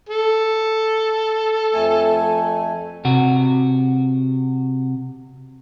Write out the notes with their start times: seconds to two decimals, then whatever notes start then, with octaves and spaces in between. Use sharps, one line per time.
0.09 A4
1.73 F2 A3 G#5
3.05 C3 F#4